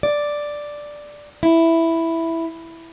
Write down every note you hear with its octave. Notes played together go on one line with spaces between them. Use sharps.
D5
E4